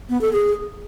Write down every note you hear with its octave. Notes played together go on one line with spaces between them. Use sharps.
B3
A4
G#4